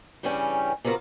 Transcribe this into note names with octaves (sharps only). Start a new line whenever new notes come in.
G2 C#3 E3 G3 C#4 G4
C3 B3 F4 F#4 A#4